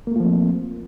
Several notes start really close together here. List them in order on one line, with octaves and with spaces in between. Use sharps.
A#3 A3 F4 F3 C4